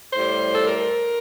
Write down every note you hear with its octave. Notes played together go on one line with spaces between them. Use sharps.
A2 G3 C5
A4
A#4